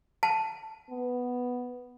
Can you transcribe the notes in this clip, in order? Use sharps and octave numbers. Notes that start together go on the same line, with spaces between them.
A5
B3